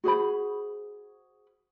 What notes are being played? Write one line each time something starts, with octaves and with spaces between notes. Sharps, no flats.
F#4 G#4 C5 B5